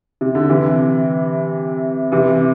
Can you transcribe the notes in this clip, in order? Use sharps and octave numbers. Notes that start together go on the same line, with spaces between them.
C3
D3
C3 E3
C3 E3